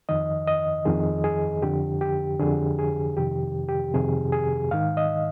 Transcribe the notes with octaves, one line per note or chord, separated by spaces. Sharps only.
F2 D#3 D#5
D#5
F2 D#3 G#4
G#4
F2 D3 G4
G4
F2 D3 G#4
G#4
F2 C3 D#3 G4
G4
F2 C3 D#3 G#4
G#4
G#2 D#3 F5
D#5